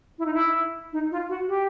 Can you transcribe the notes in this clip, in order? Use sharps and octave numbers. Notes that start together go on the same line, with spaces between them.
E4
D#4
E4
D#4
F4
F#4
G4